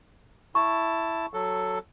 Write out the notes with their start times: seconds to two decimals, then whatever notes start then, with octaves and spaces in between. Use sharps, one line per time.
0.55 E4 A5 C#6
1.34 F#3 A4